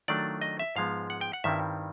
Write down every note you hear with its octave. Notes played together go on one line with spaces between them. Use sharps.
D#3 F#3 A3 D4 F4 D5
D#5
E5
G#2 F3 G#3 B3 F5
F#5
G5
F#5
G2 D#3 G3 C4 E4 E5